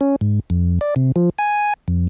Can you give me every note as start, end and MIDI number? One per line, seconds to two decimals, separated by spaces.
0.01 0.16 61
0.21 0.40 44
0.50 0.79 41
0.81 0.94 74
0.96 1.12 48
1.16 1.30 53
1.39 1.74 80
1.88 2.08 41